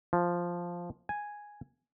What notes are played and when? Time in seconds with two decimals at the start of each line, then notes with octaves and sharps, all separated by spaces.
0.13 F3
1.09 G#5